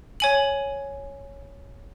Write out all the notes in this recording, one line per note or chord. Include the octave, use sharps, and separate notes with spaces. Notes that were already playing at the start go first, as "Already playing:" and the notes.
C#5 G#5 F#7